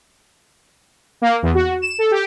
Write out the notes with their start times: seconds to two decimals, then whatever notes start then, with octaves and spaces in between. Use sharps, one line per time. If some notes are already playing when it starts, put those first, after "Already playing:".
1.22 A#3
1.43 E2
1.54 F#4
1.82 E7
1.98 A4
2.11 G4